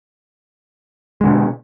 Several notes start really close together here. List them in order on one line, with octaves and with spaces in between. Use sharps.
G#3 D3 B2